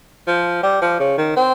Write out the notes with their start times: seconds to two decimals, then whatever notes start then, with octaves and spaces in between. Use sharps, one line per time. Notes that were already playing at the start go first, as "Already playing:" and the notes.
0.27 F3
0.63 G3
0.82 F3
1.00 C#3
1.18 D#3
1.36 C4